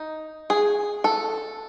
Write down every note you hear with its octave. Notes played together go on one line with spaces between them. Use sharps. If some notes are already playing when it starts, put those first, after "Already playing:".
Already playing: D#4
G#4
A4